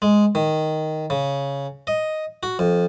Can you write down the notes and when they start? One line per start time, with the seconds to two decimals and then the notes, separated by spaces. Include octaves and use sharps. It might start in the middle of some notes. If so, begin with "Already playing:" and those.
0.02 G#3
0.35 D#3
1.10 C#3
1.87 D#5
2.43 F#4
2.59 F2